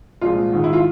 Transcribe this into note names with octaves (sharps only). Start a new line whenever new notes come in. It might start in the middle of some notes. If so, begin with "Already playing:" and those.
C2 A#2 F3 G#3 F4
G#2 D#3 G#3
E4
F4